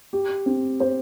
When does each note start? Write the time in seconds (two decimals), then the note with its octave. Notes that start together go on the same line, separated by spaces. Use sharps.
0.13 G4
0.46 C4
0.80 C5